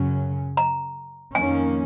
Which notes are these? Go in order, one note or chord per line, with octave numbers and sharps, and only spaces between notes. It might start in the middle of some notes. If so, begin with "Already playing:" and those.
Already playing: F#2 C#3 F#3 C#4
A#5
F2 D#3 A#3 C#4 G#5